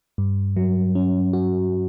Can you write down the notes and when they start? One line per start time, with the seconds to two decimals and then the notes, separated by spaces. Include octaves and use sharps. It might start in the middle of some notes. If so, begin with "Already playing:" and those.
0.18 G2
0.56 F#3
0.95 C#4
1.33 F#4